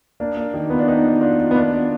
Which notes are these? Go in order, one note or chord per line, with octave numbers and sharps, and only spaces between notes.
A#3 D4
A#3
D#3
B3 F4
D4
D#4 B4
D#3
D4 F4
F4
B3
A#3 D4
F4